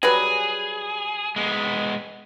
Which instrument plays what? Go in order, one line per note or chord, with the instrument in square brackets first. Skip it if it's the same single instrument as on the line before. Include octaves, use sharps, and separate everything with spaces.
[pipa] F#3 G3 B4 [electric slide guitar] G#4
[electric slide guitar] G#3 A#3 B3